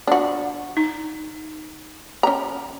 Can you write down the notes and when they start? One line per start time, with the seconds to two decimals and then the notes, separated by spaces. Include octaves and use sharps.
0.07 D4 F#4
0.77 D#4
2.23 C#4 A#5